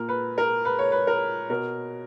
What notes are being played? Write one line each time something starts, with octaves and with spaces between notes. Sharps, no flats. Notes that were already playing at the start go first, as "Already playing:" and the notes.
Already playing: A#2 A#4
B4
A#4
B4
C#5
B4
A#4
B2 A#4